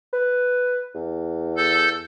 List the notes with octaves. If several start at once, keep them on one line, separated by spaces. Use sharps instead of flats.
B4
E2
A4 G6